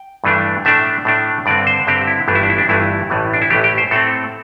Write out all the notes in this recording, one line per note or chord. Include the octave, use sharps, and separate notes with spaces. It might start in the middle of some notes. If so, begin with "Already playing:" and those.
Already playing: G5
G2 E3 A3 D4
A2 A3 D4 E5
A2 A3 D4
G2 D3 C4 D5
C5
G2 D3 C4 G4
E4
G1 G2 E3 A3 D4
E4
D4
E4
D4
G1 G2 E3 A3 E4
A1 A2 E3 A3
D4
E4
A1 A2 E3 A3 G4
G4
C5
A2 A3 C4 A4